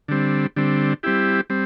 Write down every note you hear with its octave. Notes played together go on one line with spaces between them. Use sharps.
D3 G3 C4
D3 G3 C4
G3 C4 E4 G4
G3 C4